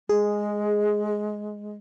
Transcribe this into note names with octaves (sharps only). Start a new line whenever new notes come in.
G#3 G#4